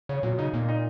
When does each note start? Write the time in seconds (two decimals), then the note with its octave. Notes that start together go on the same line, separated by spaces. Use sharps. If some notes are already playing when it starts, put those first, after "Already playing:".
0.09 C#3 C#5
0.23 A#2 F#3
0.38 C#3 D#4
0.54 A#2 A#3
0.68 D#4